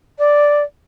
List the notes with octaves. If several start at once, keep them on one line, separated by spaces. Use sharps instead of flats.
D5